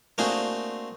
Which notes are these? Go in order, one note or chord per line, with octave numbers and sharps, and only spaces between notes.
A3 A#3 C4 D4 F#4 G#4